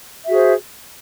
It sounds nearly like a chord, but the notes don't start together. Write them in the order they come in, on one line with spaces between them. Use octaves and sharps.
E5 F#4 G#4 C5